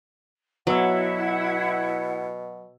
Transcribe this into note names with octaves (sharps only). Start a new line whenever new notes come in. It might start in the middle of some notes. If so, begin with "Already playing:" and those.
B2 F#3 B3 E4 C#5 F#5 E6